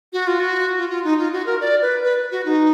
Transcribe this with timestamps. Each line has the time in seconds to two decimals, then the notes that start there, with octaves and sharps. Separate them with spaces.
0.13 F#4
0.27 F4
0.40 F#4
0.76 F4
0.90 F4
1.04 D#4
1.18 F4
1.33 F#4
1.46 A#4
1.61 D5
1.81 B4
2.03 B4
2.32 F#4
2.45 D#4